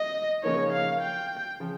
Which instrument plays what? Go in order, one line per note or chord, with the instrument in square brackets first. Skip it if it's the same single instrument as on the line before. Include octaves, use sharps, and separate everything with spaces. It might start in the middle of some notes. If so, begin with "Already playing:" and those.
Already playing: [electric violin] D#5
[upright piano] C#3 F3 A#3 D#4 [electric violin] C#5
[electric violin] F5
G5
[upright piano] C#3 F3